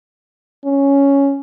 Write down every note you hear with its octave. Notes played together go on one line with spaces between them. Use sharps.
C#4